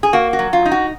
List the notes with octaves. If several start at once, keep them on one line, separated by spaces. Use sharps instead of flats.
G#4
A#3 F#4
F#4
F#3
F4
D#4
F#4